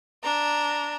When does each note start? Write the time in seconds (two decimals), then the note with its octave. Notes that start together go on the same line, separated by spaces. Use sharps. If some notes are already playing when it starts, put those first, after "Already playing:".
0.23 D4 A#5